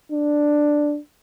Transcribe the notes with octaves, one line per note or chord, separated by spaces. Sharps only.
D4